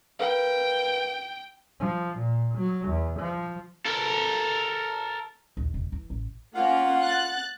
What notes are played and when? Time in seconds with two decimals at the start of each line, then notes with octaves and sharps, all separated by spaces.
0.19 A#4 B4 F5 G5
1.80 F3
2.18 A#2
2.57 F#3
2.88 E2
3.19 F3
3.86 A4 A#4
5.57 A#1 D#2
5.74 E1
5.92 E3
6.10 A1
6.55 A#3 C#4 F4 F#5
7.03 F#6 A6